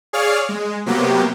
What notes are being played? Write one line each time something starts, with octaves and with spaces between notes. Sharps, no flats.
G#4 C#5 D5 F5 F6
G#3
C3 F#3 A#3 B3 G4